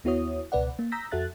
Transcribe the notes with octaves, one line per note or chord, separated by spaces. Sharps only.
D#2 B3 E4 F#4 C#5 D#6
C#2 B2 B4 D5 F#5
A#3
A#5 D#6 E6 G6 A#6 B6
F2 F#4 A4 E5 F#6 A6